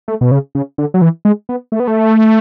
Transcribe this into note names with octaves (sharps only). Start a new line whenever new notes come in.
A3
B2
C#3
C#3
D3
F#3
E3
G#3
B3
A3
B3
A3